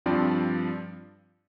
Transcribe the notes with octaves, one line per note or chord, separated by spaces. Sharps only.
G2 F3 C4 D4 D5